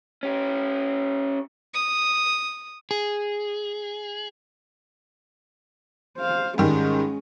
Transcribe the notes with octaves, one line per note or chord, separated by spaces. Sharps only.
C#4 G4
D#6
G#4
C5 F5
G#2 D#3 G3 G#3 C#4